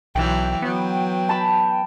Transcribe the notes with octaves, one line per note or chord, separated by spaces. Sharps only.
B1 E3 F#3 G5
F#3 B3
A5 B5